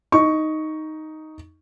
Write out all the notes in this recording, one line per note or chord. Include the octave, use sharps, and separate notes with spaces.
D#4 C#6